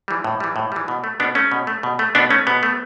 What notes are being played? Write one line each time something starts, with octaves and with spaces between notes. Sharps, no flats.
E3 G3
A2
E3 G3
A2
E3 G3
B2
A3
B2 B3 D4
A3 C#4
B2
A3
B2
A3
B2 B3 D4
A3 C#4
B2 B3
A3